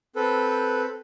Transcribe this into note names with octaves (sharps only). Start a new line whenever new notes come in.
C4 A4 B4